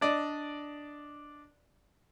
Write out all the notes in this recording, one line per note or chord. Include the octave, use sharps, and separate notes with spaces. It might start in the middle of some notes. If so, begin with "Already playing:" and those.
D4 D5 D#5